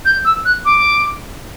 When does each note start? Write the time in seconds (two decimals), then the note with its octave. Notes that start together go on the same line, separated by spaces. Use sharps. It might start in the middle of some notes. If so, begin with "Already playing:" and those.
0.05 G6
0.25 E6
0.45 F#6
0.65 D6